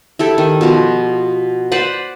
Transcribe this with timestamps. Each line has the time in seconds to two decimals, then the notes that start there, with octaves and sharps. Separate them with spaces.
0.19 E4 G4 A4
0.38 D#3
0.61 B2 F3
1.72 B4 C5 D5 F#5